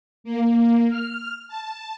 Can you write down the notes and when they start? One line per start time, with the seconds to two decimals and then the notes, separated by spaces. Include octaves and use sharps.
0.24 A#3
0.89 F6
1.48 A5